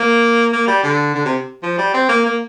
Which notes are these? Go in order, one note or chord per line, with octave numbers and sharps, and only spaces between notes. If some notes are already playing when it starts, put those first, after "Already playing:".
Already playing: A#3
A#3
G3
D3
D3
C3
F3
G3
C4
A#3
A#3